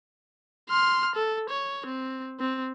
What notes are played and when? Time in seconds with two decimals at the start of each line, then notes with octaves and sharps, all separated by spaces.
0.70 C6 F6
1.15 A4
1.50 C#5
1.86 C4
2.40 C4